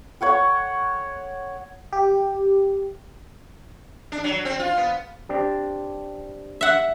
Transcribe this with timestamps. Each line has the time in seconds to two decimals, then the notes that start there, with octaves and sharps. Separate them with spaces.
0.21 C#5 F#5 G5
1.93 G4
4.12 D4
4.24 F#3
4.45 C4
4.59 F4
4.77 B3
5.29 C4 D4 G4
6.61 E5 F#5